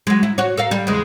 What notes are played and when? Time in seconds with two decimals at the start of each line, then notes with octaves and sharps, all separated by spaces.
0.07 F#3 G#3
0.23 E4
0.38 F#4 C#5
0.58 A4 A#4 F5
0.71 G3
0.87 E2 C#3 G#3